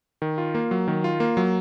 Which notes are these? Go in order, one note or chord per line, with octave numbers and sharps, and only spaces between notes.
D#3
F4
A#3
F#3
D#3
F4
A#3
F#3